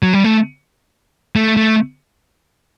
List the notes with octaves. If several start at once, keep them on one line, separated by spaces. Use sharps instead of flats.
F#3
G3
A3
A3
A3